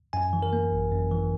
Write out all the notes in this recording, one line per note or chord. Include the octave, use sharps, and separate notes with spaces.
F#2 G#5
E3
A#4
A#3
G#1
F#2
E3